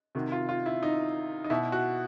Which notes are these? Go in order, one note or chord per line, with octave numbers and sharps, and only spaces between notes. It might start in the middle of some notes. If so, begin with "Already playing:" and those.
C3 D#3 F#4
F4
F4
E4
D#4
D#4
B2 E4
F#4